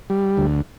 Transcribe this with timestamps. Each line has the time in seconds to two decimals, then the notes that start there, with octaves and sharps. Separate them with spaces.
0.10 G3
0.37 D2